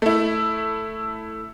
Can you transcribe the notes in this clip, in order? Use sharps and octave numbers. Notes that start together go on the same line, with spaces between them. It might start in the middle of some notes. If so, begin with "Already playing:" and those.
A3 E4